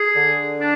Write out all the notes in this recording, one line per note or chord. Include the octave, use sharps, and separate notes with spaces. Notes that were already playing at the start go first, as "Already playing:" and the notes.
Already playing: G#4
D3
D4